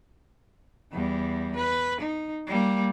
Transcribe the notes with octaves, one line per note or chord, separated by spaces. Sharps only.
E2 G3
B4
D#4
G3 A#3